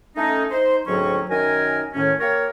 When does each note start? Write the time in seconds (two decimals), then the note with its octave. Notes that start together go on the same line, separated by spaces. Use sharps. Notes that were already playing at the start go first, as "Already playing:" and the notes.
0.16 A3 C#4 D#4
0.50 D#4 C5
0.86 D2 G#2 F#3 C4 C#4 C#6
1.29 F#2 D#3 A#4 G#5
1.94 A2 D#3 C#4
2.19 A#3 G4 A#4 C#5